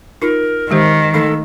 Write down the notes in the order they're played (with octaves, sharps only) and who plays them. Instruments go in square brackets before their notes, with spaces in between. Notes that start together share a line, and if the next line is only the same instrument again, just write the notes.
[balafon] D#4 F4 [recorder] A#4
[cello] D#3 [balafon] G#3 G4 C5
[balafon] A3 D#4 [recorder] A4